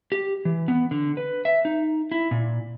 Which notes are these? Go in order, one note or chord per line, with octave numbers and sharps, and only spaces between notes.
G4
E3
B3
D3
B4
E5
D#4
E4
A#2